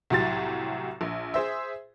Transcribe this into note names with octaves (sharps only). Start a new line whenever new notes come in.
C2 A2 F#3 G4 C6 A6
A#1
G#4 C5 E5